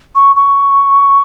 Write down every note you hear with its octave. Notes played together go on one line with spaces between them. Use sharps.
C#6
C#6